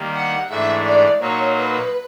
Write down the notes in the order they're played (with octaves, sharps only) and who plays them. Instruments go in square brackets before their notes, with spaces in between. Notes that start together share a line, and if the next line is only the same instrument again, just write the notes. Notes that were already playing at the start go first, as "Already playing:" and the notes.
Already playing: [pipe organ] D#3 G3 A#3
[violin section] F#5
[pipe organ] G#2 E3 A3 D4 [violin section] E5
[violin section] D5
[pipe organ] A#2 F#3 A#3 D#4 [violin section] C#5
[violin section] B4